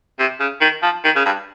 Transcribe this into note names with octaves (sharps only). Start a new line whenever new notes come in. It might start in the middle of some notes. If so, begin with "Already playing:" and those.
C3
C#3
D#3
F3
D#3
C#3
G2